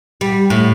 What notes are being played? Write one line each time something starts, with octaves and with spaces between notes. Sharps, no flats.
G3
A2